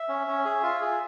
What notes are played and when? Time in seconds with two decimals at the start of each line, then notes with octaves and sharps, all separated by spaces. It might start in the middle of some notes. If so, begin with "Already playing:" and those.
Already playing: E5
0.09 C#4
0.27 C#4
0.45 G#4
0.63 F4
0.82 G#4